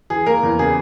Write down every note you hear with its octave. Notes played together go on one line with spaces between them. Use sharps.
E3 G#4
A#3 A#4
E2
C#3 G#4